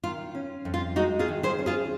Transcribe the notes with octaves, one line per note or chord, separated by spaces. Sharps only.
D#3 F4
C#4
F2
F4
G#3 D#4 F#4
F4 G#4
D#3
G#4 C5
C#4
F4 G#4